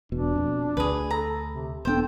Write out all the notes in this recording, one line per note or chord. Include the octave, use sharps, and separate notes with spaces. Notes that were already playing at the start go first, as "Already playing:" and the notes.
E1 B2 D4
F2 B2
D2 G#4 B4
A4 A#5
C3
E1 B3 D4 A4 C5 G5